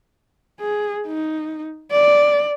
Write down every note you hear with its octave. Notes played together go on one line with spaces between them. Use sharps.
G#4
D#4
D5